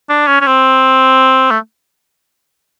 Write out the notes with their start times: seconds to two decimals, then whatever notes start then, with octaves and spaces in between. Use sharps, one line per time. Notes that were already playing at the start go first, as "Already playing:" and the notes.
0.09 D4
0.27 C#4
0.41 C#4
0.47 C4
1.51 A3